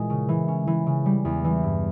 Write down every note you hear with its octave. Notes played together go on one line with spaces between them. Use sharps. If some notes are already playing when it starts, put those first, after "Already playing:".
Already playing: A#2 E3 G#3
C#3
E3
C#4
E3
C#3
G3
E2
E3
G2